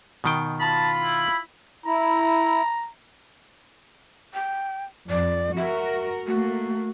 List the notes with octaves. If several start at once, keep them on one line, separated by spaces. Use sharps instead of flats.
B2 D#3 G5
F4 A5 B5
E4
E4 A#5
G5
F2 D5
F#4 A#4 E5
A3 A#3 F#4